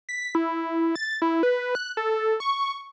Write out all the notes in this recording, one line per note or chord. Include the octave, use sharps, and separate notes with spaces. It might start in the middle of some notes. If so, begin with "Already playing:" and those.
B6
E4
A6
E4
B4
F#6
A4
C#6